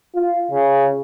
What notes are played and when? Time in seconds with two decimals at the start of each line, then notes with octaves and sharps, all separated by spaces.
0.15 F4
0.51 C#3